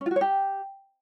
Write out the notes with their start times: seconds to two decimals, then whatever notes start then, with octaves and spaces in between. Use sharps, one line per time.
0.01 C#4
0.06 F4
0.11 F#4
0.16 C#5
0.21 G4